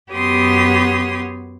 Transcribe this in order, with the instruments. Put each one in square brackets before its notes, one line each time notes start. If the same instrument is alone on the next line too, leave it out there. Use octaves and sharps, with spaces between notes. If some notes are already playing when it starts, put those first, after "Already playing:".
[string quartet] F#2 B3 G4 C#5 C6 D#6